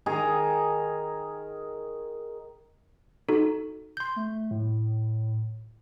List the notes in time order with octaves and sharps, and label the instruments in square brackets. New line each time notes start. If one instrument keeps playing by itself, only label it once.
[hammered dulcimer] D#3 G#4 A#5
[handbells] D#4 F#4 A4
C6 G6
[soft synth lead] A3
A2